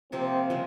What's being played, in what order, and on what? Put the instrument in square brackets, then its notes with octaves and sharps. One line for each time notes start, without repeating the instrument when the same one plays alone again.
[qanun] C3 F3 A#3 [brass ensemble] C4
[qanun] C#3 F3 G#3